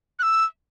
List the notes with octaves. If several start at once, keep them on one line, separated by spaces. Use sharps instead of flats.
F#6
E6